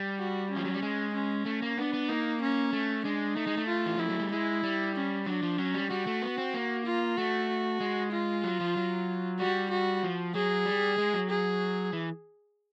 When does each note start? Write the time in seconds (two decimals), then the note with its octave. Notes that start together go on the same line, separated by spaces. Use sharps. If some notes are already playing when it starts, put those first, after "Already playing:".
Already playing: G3
0.19 F#4
0.51 C#4
0.56 F3
0.65 F#3
0.74 G3
0.82 G#3
1.14 C#4
1.45 A3
1.62 A#3
1.78 B3 D4
1.93 B3
2.09 A#3 D#4
2.42 C#4
2.73 A3
3.05 G#3 D4
3.36 A3 D#4
3.47 G#3
3.57 A3
3.68 F4
3.86 E3
3.98 F3 E4
4.09 F#3
4.20 G3
4.31 G#3 E4
4.63 G3
4.95 C#4
5.26 F#3 D4
5.43 F3
5.58 F#3 C#4
5.74 G3
5.90 G3 F#4
6.07 A3
6.22 B3
6.38 C4
6.54 A#3
6.86 F4
7.17 A3 F#4
7.80 G#3
8.12 F4
8.44 F#3
8.60 F3
8.76 F#3
9.39 G3 F#4
9.71 F#4
10.03 F3
10.34 F#3 G#4
10.66 G3
10.98 G#3
11.13 F#3
11.30 G#4
11.93 E3